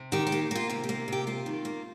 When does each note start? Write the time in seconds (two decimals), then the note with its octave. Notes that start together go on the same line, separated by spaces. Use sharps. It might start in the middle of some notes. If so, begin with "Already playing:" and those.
Already playing: C3
0.12 D#3 G4
0.27 G4
0.32 A#3
0.51 A#3 F4
0.70 C3 G4
0.84 G4
0.89 A#3
1.08 C3 G4
1.27 A#3 F4
1.46 D#3
1.65 A#3